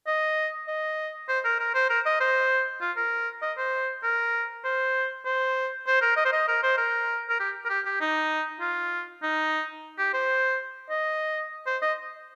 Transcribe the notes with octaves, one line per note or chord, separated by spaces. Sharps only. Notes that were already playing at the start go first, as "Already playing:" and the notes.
D#5
D#5
C5
A#4
A#4
C5
A#4
D#5
C5
F4
A#4
D#5
C5
A#4
C5
C5
C5
A#4
D#5
C5
D#5
A#4
C5
A#4
A#4
G4
A#4
G4
G4
D#4
F4
D#4
G4
C5
D#5
C5
D#5